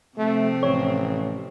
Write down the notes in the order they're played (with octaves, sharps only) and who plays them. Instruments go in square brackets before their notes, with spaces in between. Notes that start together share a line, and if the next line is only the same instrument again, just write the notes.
[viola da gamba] C3 F3 C4 [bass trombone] A3
[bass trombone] A1 [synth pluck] C#5